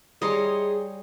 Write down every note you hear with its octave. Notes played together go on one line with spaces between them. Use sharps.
G3 G#4 C#5 D#5 A#5 C6